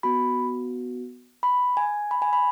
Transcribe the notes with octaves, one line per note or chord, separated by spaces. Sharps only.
B3 F#4 B5
B5
G#5
B5
G#5
B5